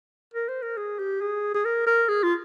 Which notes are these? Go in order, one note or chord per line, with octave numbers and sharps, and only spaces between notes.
A#4
C5
A#4
G#4
G4
G#4
G#4
A#4
A#4
G#4
F4